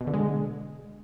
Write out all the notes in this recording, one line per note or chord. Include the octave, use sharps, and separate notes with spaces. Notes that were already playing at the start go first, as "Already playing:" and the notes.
B2
D3
G#3